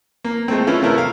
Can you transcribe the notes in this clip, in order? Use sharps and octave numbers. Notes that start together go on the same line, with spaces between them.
A#3
G#3 A3 C4
E3 C#4 E4 F4
C3 A3 E4 A#4
F5